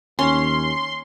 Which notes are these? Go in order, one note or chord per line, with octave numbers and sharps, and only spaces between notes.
D#2 C#4 C6